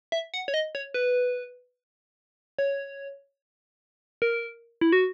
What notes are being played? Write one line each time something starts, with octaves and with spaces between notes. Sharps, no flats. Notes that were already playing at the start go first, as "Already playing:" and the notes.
E5
F#5
C#5
D#5
C#5
B4
C#5
A#4
E4
F#4